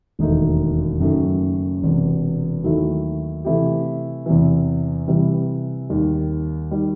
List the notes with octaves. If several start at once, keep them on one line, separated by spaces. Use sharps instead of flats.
E1 D#2 D#3 A3 D#4
F#1 F#2 D#3 F#3 A3
E1 E2 C3
D#2 D#3 F#3 A3 E4
C3 E3 A3 E4 G4
E2 C3 E3
C3 E3 G3
D#2 D#3 G3
D#3 G3